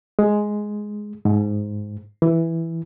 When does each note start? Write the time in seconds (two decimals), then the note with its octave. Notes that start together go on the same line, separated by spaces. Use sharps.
0.19 G#3
1.25 G#2
2.22 E3